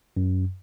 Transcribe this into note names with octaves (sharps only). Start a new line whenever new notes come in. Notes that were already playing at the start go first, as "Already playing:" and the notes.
F#2